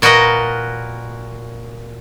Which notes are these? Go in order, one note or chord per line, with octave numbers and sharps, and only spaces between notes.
A#2 F#4 A#4 B4 D#5